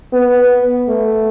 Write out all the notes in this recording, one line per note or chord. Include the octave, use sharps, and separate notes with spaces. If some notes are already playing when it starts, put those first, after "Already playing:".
B3
A3